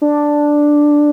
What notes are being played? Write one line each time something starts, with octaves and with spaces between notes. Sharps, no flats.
D4